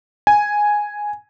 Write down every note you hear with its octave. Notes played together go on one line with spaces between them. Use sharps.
G#5